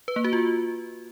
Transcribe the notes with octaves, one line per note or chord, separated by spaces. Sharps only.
B4
A#3
F#4
F4